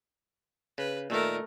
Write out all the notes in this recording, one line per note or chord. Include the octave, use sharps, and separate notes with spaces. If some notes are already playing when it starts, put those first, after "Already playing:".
C#3 B4
A#2 D#3 A3 A#4 E5